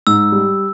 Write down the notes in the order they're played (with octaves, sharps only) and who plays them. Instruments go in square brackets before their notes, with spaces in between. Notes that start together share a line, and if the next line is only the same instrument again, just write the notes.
[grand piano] G#2 [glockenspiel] E6
[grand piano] G3